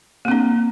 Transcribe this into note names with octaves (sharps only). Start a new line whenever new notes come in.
A#3 C4 D4